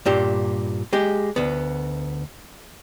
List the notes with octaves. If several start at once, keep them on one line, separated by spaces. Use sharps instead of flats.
G2 A#2 G4
G#3 G4
D2 B3